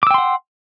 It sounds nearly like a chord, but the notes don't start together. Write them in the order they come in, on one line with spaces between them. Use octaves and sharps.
D6 E6 G5 C6 F#5